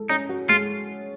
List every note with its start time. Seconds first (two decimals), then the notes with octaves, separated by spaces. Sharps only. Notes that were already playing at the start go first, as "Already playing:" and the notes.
Already playing: G#3 A4
0.09 C#4 D#4
0.29 F#4
0.49 G#3 F4